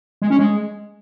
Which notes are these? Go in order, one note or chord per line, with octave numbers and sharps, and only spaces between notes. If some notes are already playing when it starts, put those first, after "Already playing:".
G#3
C#4
G#3